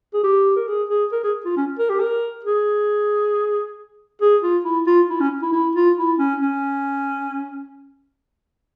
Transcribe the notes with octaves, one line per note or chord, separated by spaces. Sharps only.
G#4
G4
A#4
G#4
G#4
A#4
G#4
F4
C#4
A#4
G4
A#4
G#4
G#4
F4
E4
F4
E4
C#4
E4
E4
F4
E4
C#4
C#4